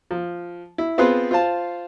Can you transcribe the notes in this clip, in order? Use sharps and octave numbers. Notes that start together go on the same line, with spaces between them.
F3
E4
B3 C4 F4 G#4 B4 C5
F4 C5 F5 A5